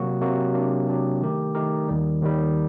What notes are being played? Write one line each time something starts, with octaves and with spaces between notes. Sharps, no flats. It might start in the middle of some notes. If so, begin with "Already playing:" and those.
Already playing: C3 F#3 A#3 F#4
C3 F#3 A#3 F#4
C3 F#3 A#3 D4 G4
C3 F#3 A#3 D4 G4
D#3 A3 D#4 G4 A#4
D#3 A3 D#4 G4 A#4
D#2 D#3 G3
D#2 D#3 G3